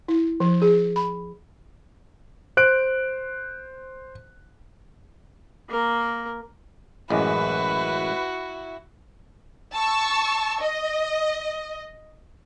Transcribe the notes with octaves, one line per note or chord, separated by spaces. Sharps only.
E4
F3
G#4
B5
C5 F#6 D7
A#3 A#4
A1 F#2 G#3 E4 F#4 B4
A5 C#6 E6
D#5